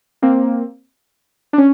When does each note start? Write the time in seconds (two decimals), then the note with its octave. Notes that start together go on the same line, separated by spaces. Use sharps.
0.22 A#3 C4
1.53 D4
1.58 C#4